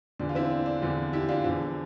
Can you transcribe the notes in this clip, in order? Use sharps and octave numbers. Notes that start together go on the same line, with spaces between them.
E2 D3 F3 D4
F4
C4 E4
D4
D4
E2 D3 F3
E4 G4
D4 F4
E2 D3 F3